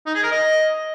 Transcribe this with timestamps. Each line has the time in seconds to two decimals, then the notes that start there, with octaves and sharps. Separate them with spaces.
0.06 D#4
0.15 G#4
0.23 A#4
0.32 D#5